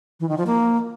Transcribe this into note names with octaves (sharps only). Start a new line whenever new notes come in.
E3
D#3
F3
A#3